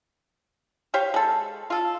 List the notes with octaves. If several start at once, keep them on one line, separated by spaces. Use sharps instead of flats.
G4 C5 C#5 F5
G#3 A4
F4 A4